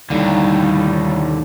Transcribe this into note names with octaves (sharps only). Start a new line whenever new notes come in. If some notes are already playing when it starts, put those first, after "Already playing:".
D#2 A2 D3 G3 D#4